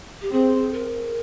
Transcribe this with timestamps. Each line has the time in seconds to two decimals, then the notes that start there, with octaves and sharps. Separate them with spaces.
0.21 G4
0.31 C4 G#4
0.73 A#4